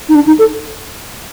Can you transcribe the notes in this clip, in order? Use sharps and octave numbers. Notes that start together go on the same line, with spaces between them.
D#4
D4
D#4
A4